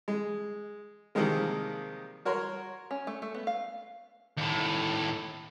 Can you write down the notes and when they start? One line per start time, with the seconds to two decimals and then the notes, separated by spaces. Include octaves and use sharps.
0.08 G#3
1.15 C3 D#3 F3 G3 G#3 A#3
2.25 F#4 A#4 C#5 A#5 C6
2.91 C#4
3.07 A3
3.22 A3
3.35 B3
3.47 F5
4.38 D#2 A2